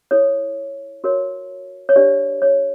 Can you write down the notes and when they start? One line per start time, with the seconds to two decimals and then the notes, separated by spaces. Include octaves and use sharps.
0.11 E4 A4 C#5
1.04 F#4 A#4 C#5
1.89 C#5
1.96 D4 G4 B4 D5
2.42 C#5